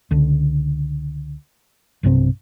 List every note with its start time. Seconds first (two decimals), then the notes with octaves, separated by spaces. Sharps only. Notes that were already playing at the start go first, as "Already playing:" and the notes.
0.11 C#2 D3
2.03 B1 G2 C3 C4